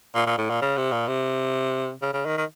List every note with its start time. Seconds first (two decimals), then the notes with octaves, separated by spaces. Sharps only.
0.15 A#2
0.27 A#2
0.38 A2
0.50 A#2
0.62 C#3
0.77 C3
0.92 A#2
1.08 C3
2.02 C#3
2.13 C#3
2.26 D#3
2.38 D#3